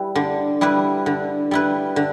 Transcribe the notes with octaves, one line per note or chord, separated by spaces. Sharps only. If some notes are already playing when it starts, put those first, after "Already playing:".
Already playing: G3 E4 B4
D3
G3 E4 B4
D3
G3 E4 B4
D3